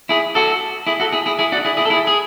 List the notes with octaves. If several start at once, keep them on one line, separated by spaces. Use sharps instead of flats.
E4 G#4
F#4 A4
E4 G#4
F#4 A4
E4 G#4
E4 G#4
E4 G#4
D4 F#4
E4 G#4
E4 G#4
A4
E4 G#4
G#4